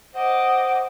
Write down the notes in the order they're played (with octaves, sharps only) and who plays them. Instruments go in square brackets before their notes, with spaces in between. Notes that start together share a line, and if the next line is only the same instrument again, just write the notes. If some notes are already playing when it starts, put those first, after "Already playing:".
[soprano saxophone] C5 [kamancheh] D#5 D6 [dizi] F#5